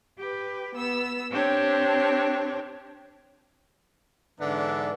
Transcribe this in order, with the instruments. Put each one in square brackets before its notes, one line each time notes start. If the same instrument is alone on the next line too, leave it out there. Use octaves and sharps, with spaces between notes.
[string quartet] G4 B4
B3 E6
C4 D4 G4 C#5
[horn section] G#2 D3 E3 B3 D4